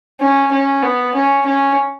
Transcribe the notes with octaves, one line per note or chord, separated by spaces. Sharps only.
C#4
C#4
B3
C#4
C#4